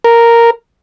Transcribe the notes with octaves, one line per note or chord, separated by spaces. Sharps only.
A#4